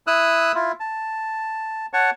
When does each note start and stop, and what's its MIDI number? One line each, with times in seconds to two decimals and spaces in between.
0.07 0.52 64
0.07 0.52 87
0.07 0.52 88
0.07 0.52 90
0.55 0.72 64
0.55 0.72 65
0.80 1.86 81
1.93 2.10 73
1.93 2.10 78
1.93 2.10 81
1.93 2.10 85